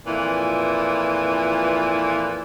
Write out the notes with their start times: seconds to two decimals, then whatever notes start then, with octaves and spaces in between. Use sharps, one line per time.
0.06 F2 A#2 E3